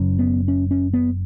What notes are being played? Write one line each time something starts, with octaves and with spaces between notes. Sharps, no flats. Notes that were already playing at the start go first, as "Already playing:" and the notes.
Already playing: F#1 F#2 C#3
B3
C#4
C#4
B3